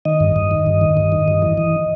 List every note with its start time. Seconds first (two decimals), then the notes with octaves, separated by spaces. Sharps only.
0.05 D#3 D#5
0.20 G2
0.36 G2
0.51 D#3
0.66 G2
0.81 D#3
0.97 G2
1.12 D#3
1.28 G2
1.42 E3
1.58 E3